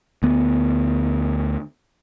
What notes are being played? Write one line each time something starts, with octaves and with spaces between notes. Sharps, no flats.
D2 B3